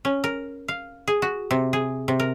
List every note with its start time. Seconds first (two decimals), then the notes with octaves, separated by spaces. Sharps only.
0.05 C#4
0.24 A#4
0.68 F5
1.08 G#4
1.22 F#4
1.51 C3
1.73 G#4
2.08 C3
2.20 A#4